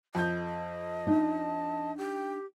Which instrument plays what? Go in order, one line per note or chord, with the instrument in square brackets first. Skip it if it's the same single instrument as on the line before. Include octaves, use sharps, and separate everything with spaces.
[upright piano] F2 G6 [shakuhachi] D#5
[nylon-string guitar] D4 D#4 [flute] A5
[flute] G4 [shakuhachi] G5